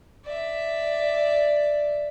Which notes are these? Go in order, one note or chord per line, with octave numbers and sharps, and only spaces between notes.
D5 E5